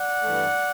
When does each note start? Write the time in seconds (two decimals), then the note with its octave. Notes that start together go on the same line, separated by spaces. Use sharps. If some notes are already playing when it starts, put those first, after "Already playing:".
Already playing: D5 F#5
0.23 G2 E3 A3